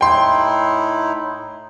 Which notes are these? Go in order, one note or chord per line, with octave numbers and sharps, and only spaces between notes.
A2 D#4 E4 G5 C6